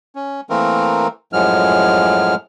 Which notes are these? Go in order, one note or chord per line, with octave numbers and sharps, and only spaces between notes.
C#4
E3 A3 A#3 C4 A#4
F#2 A2 F3 F#3 G#3 F6